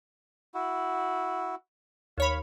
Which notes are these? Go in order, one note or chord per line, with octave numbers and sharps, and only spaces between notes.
E4 F#4
D#2 C#5 F5 B5